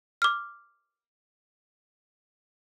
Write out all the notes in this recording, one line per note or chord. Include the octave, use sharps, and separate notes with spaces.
D6 F6